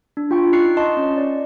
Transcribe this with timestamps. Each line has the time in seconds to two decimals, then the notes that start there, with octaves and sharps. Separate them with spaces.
0.17 D4
0.31 F4 G5 C#6
0.53 D#4 C#6 F#6 C7 C#7
0.77 D#5 A5 C6 C#6
0.97 C#4
1.18 D5